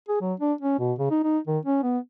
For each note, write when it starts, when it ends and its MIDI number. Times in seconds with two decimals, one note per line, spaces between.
0.08 0.19 68
0.21 0.33 54
0.40 0.53 62
0.61 0.79 61
0.79 0.93 47
0.98 1.10 49
1.11 1.21 63
1.23 1.38 63
1.47 1.58 51
1.65 1.79 61
1.83 1.98 59